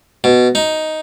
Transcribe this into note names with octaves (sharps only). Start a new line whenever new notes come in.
B2
D#4